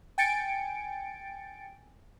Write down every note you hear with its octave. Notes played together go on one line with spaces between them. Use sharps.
G5 G#5 A6 C#7 D7